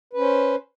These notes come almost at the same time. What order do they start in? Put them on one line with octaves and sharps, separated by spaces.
B4 C#4 C5